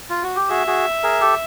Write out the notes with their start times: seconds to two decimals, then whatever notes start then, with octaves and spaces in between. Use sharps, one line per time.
0.10 F4
0.23 F#4
0.36 G4
0.50 F#4 G#4 E5
0.67 F#4 G#4
1.03 G#4 A#4
1.21 G4 A4